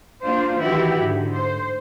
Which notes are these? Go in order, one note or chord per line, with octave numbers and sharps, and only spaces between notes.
A#3 D4 F4 C5
D#3 E3 E4 F#4 G4
G#2 D3
C5